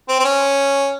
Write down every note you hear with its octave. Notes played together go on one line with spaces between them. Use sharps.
C4
C4
C#4